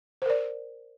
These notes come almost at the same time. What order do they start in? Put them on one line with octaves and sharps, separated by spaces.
C5 A#4 D5